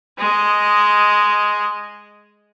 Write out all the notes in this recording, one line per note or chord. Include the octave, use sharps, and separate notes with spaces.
G#3 D#5